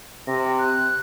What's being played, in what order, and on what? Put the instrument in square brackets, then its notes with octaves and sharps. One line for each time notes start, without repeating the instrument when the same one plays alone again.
[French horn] C3 [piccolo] A#6
[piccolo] F#6